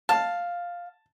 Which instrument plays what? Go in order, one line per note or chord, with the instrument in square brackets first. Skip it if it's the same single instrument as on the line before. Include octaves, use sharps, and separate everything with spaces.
[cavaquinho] F5 [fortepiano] A5